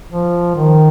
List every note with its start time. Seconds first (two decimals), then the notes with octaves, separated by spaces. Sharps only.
0.10 F3
0.55 D#3